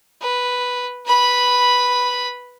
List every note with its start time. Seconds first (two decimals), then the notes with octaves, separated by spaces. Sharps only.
0.21 B4
1.06 B4 B5